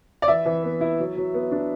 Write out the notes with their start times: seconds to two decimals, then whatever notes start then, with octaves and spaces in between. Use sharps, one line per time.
0.22 D5
0.28 E3 E5
0.46 E3
0.63 B3
0.81 E4
0.99 F#3
1.17 F#3
1.34 B3
1.52 D4